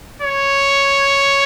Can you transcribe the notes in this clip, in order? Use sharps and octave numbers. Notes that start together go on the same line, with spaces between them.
C#5